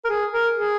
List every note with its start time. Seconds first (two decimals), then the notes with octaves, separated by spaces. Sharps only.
0.05 A#4
0.10 G#4
0.32 A#4
0.55 G#4